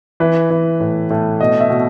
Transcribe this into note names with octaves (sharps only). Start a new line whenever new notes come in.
E3 B4
E3
A2
A2
B2 D#5
E5
B2